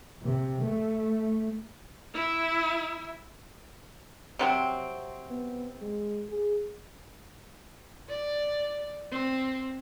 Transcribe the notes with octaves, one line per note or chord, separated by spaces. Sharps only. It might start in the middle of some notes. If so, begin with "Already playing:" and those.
C3
A3
E4 E5
C3 F#3 C4
B3
G#3
G#4
D5
C4